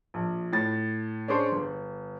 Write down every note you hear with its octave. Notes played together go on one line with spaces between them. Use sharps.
A#1
A2 A6
C#4 D4 G#4 C5 C#5
G1